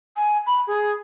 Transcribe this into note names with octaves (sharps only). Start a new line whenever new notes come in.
G#5
B5
G#4